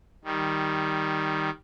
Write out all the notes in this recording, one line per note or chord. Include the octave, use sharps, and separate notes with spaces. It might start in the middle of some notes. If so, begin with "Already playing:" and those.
D#3 G3